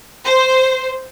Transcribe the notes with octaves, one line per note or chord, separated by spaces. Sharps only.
C5